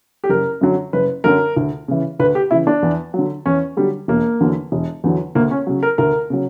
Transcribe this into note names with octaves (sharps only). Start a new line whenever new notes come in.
G4
F#1 A#4
F#2 D3 F#3
F#1 B4
F#2 D3 F#3 A#4
D2
C#3 E3
D2 B4
G4
C#3 E3 E4
D4
E2
D3 F#3
E2 C#4
D3 F#3 G3
E1 A#3
E2 D3 F#3
E1
E2 D3 F#3
D2 A#3
C#4
C#3 F#3
A#4
D2 A#4
C#3 F#3